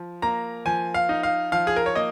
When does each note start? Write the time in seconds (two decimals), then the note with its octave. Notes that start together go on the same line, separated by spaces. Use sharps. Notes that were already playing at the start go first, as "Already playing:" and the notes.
Already playing: F3
0.22 A#3 A#5
0.65 F3 G#5
0.94 F5
1.09 D#4
1.23 F5
1.52 F3 F5
1.67 G#4
1.76 A#4
1.86 C#5
1.95 A#3 D#5